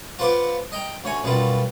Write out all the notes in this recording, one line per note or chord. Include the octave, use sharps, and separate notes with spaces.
F4 B4 C5 F#5 C6 D6
D#5 G5 A#5
D2 C#5 G#5
F#2 B2 G3 F4